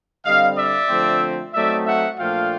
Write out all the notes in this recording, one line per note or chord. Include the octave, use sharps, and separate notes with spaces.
D3 G3 C4 D#5 F5
D5 E5
D3 F3 A3 C4
F#3 A3 C4 D#4 D5 E5
E5 F#5
A#2 F3 A3 D4 F4 F5 G5